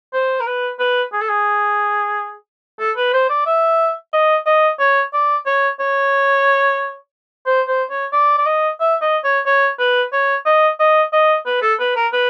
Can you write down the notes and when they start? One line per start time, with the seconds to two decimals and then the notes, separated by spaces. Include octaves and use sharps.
0.14 C5
0.40 A#4
0.47 B4
0.79 B4
1.13 G#4
1.22 A4
1.29 G#4
2.80 A4
2.97 B4
3.14 C5
3.30 D5
3.46 E5
4.13 D#5
4.47 D#5
4.79 C#5
5.14 D5
5.46 C#5
5.80 C#5
7.46 C5
7.68 C5
7.91 C#5
8.13 D5
8.38 D5
8.46 D#5
8.80 E5
9.02 D#5
9.24 C#5
9.46 C#5
9.79 B4
10.13 C#5
10.46 D#5
10.80 D#5
11.13 D#5
11.46 B4
11.62 A4
11.80 B4
11.96 A#4
12.13 B4